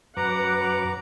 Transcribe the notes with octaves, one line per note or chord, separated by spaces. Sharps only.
F#2 B4 F#5 A#5 D6